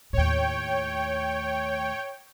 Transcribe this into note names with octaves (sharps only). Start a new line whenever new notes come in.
D#2 A2 C#5 G5